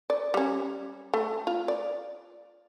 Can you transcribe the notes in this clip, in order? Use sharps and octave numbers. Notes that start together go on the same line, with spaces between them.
D5
G3 C#4
A3
F4
D5